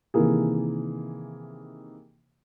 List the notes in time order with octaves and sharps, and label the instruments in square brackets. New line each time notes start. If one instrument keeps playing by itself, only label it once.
[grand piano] C3 D#3 E3 A#3 G#4